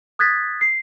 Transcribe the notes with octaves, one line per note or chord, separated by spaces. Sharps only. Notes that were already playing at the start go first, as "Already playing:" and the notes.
D#6 F#6 G#6 A6 B6
C7